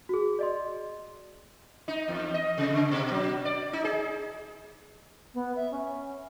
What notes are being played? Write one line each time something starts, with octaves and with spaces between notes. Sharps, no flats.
F#4 G#4
D5 D#5 C6
D#4
E2
D#5
C3
C#3
B2
F#3
D5
D#4
G#4
B3
E5
C#4